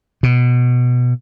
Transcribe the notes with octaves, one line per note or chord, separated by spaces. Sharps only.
B2